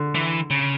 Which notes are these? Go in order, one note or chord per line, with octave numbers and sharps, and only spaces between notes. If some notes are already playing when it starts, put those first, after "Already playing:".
Already playing: D3
E3
C#3